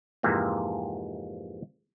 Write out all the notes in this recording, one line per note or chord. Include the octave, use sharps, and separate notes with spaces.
F2 G#2 C3 E3 A#3 C4